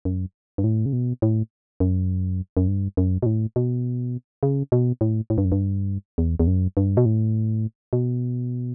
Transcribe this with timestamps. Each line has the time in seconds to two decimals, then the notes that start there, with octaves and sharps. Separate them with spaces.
0.05 F#2
0.58 G2
0.64 A2
0.86 C#3
0.93 B2
1.22 A2
1.80 F#2
2.57 F#2
2.68 G2
2.97 F#2
3.22 B2
3.26 A2
3.56 B2
4.43 C#3
4.72 B2
5.01 A2
5.30 A2
5.38 G2
5.45 F#2
5.52 G2
6.18 E2
6.40 E2
6.47 F#2
6.77 G2
6.97 B2
7.06 A2
7.93 B2